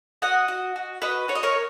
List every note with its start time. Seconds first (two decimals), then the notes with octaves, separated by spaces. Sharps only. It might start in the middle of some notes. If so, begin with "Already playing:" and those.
0.22 F#4 D#5 F#5
0.48 F#4
0.76 F#4
1.02 F#4 B4 D#5
1.28 F#4 C#5
1.35 D#5
1.43 A#4 C#5